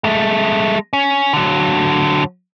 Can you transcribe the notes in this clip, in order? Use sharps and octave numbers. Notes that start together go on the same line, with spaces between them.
G#3 A3
C#4
D3 F#3